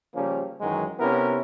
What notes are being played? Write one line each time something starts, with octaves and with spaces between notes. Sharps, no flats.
C#3 F3 G3 A#3 C#4
F#2 D#3 E3 F#3 G#3
C3 B3 C#4 E4 A#4